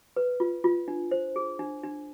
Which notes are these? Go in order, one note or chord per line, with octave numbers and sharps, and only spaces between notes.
B4
F4
F4
D4
C5
G#4
D4
D4